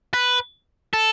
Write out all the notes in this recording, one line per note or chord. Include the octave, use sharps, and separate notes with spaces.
B4
A4